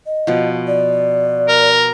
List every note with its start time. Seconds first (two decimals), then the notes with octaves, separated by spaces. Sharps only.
0.06 D#5
0.27 B2 F3
0.67 D5
1.49 A#4